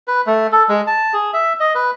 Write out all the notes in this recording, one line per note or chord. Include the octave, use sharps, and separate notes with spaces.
B4
A3
A4
G#3
A5
G#4
E5
D#5
B4